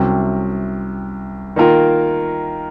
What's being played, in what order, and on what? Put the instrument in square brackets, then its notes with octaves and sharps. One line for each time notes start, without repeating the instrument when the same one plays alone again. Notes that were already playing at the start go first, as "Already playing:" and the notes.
Already playing: [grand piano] C2 C3 F#3 C#4
D#3 A#3 F4 A#4